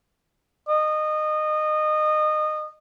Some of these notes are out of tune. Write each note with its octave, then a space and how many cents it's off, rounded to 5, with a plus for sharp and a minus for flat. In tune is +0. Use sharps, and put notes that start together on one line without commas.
D#5 -25